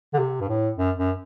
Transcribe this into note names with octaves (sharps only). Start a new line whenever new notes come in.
D3
C3
G2
A2
F#2
F#2